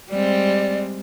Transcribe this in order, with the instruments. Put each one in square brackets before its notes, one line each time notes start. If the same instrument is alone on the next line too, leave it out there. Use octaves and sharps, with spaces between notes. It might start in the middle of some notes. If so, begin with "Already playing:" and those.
[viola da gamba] G3 G#3 C4 [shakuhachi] D5